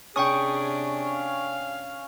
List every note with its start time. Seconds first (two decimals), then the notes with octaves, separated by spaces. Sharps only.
0.16 C3 C#4 D4 G#4 G5 C#6 D#6
1.11 F5